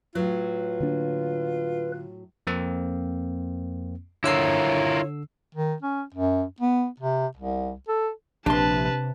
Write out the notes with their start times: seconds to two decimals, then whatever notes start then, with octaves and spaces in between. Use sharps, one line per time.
0.15 A2 F#3 F4 B4
0.80 D3 A#3 D4
2.47 F2 A#3 C4
4.24 D3 E4 F4 A#4 C#5 E6 C7
5.55 D#3
5.82 C#4
6.14 F#2
6.60 B3
7.00 C3
7.37 C2
7.88 A4
8.46 A#1 C3 D4 B4 A5 C6